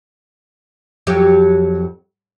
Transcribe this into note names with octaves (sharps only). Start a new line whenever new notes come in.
F2 F#3 G4